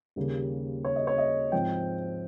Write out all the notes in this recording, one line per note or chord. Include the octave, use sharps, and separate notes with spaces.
D#2 C#3 G3 A#3
C#5
D#5
C#5
D#5
G#2 F3 C4 G5